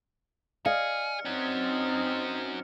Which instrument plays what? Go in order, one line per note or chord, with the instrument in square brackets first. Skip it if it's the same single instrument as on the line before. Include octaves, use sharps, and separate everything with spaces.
[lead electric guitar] G#4 [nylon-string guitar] D5 D#5 F5 [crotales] F6 C#7
[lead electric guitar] F#3 C#4 [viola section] C4 D#4